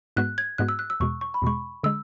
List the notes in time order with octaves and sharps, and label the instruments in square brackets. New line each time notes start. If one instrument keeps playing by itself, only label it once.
[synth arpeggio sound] G#2 G#3 B3 F#4 [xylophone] F#6
[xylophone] G#6
[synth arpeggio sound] G#2 G#3 B3 F#4 [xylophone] F#6
[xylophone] E6
F#6
E6
[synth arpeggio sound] E2 B2 G#3 [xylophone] C#6
[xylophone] C#6
B5
[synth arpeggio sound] E2 B2 G#3 [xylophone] C#6
[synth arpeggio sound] D3 G#3 [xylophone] E6